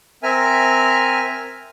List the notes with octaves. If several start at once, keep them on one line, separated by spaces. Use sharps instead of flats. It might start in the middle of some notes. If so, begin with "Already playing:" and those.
C4 A#4 E5 G#5 F6